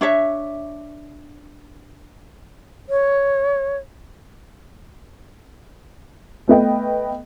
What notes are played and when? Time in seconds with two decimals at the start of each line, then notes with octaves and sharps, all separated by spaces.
0.01 D4 C#5 E5
2.89 C#5
6.48 A3 B3 D#5 G5